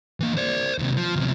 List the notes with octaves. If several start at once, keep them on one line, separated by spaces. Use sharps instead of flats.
E3 A#3
C5 D5
D#2 C3
F3
D2 C3